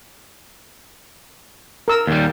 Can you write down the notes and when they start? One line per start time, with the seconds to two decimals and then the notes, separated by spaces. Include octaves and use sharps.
1.88 A#4 E6
2.07 D#2 G3